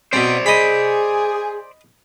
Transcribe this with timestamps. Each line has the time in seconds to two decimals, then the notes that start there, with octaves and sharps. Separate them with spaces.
0.13 B2 C4 C5 D5
0.46 G#4 D#5 B5